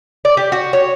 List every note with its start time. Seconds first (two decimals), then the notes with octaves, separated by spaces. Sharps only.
0.25 D5
0.37 G4
0.52 F#4
0.73 C#5